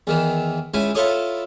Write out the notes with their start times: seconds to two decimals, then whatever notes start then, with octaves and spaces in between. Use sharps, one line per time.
0.07 E2 D#3 E3
0.74 C#2 C#3 E4 G#5
0.95 E4 F4 A4 C#5 D#6